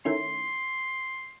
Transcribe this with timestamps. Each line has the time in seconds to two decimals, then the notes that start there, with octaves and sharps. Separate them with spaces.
0.05 D#3 A3 C#4 E4 C6